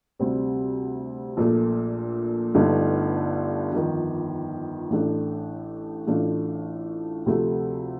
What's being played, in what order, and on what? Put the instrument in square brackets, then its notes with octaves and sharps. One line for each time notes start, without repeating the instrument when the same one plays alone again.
[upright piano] D2 C3 G3 C4
A#1 A#2 A3
G1 G2 D3 A3 D#4
G1 F2 D#3
A1 A2 A3 D4
A1 A2 A3 D4 F4
D2 C3 F3 A3